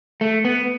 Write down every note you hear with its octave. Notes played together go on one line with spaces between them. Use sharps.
A3
B3